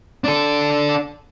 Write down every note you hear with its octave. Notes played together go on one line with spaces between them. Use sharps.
D4 A4